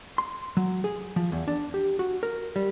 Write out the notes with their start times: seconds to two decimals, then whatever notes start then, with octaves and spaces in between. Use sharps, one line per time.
0.18 C6
0.57 F#3
0.84 G#4
1.16 F3
1.32 E2
1.48 D4
1.74 G4
1.99 F#4
2.23 A#4
2.56 G3